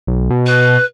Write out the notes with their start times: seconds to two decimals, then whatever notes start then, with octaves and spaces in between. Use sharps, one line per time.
0.07 B1
0.30 B2
0.46 B4